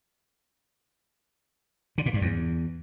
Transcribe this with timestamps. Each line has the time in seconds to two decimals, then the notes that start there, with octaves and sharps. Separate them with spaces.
1.98 D3
2.06 A#2
2.14 G2
2.21 E2